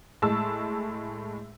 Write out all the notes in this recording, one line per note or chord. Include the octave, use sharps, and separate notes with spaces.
A2 G#3 A5 E6